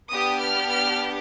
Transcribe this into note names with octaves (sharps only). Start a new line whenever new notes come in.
B3 D4 G4 D#6
F6
F6